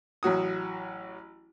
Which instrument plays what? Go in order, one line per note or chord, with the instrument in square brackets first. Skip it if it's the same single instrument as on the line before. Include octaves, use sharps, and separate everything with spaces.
[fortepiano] A1 F#3 F#4 D#6